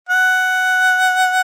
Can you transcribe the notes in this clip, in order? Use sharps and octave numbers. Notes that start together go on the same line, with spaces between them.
F#5